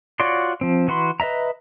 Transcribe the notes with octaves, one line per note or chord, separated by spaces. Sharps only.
F4 F#4 C#5 D5 C6
F3 C4
E3 F#4 B5 C6
B4 D#5 E5 A#5